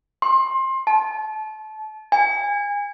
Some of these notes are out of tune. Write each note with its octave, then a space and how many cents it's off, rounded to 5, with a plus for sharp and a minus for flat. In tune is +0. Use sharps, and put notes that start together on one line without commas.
C6 +25
A5 -30
G#5 -30